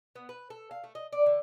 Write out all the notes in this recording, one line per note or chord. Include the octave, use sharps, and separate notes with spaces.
B3
B4
A4
F5
A3
D#5
D5
D3